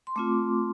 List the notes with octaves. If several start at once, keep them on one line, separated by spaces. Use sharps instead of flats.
C6
A3 C4 F4 D6